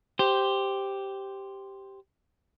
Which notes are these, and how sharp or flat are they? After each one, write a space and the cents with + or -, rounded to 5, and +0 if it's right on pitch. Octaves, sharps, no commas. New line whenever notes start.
G4 +0 C5 +0